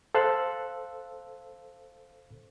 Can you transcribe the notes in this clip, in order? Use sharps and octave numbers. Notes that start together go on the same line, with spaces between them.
A4 C5 F5 E6 F#6